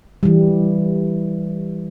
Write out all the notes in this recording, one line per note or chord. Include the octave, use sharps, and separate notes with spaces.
E3 G3